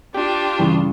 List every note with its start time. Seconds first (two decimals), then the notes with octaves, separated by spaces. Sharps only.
0.14 D4 F4 G4
0.59 G2 C#3 E3